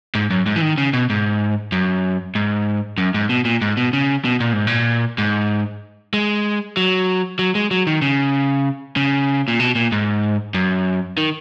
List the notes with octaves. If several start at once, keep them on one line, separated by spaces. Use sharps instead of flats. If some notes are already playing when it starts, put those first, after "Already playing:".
G#2
F#2
G#2
E3
D#3
C#3
B2
G#2
F#2
G#2
F#2
G#2
B2
A#2
G#2
B2
C#3
B2
A#2
G#2
A#2
G#2
G#3
F#3
F#3
G#3
F#3
D#3
C#3
C#3
A#2
B2
A#2
G#2
F#2
D#3